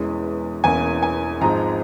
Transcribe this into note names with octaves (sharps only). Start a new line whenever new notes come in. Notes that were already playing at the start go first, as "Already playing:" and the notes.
Already playing: E1 E2 E3 G#3 C#4
E1 E2 E3 A#3 C#4 G#5
G#5
G#1 G#2 F3 G#3 C4 A#5